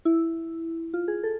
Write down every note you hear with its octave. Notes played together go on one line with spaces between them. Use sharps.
E4
F4
G#4
A4